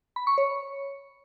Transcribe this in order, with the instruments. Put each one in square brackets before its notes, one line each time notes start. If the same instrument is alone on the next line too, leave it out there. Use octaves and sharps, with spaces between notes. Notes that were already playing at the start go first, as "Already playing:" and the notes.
[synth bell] B5
C#6
C#5